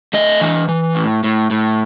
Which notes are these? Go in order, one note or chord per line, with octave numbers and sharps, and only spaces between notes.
A3 D#5
E3
E3
A2
A2
A2